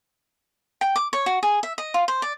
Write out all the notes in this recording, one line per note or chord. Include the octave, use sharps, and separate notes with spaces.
G5
D6
C#5
F#4
G#4
E5
D#5
F4
C5
D5